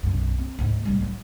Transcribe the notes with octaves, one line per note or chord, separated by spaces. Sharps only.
B1 F#2
C4
D2 G#2
G#2 G3
F#3